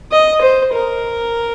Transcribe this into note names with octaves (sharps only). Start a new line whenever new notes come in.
D#5
C5
A#4